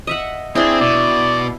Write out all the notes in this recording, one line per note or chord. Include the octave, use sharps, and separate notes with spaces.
D#5 E5 F#5
C4 D4 E4 G#4
B2 D5